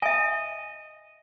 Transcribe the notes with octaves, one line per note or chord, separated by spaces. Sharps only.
D#5 E5 G#5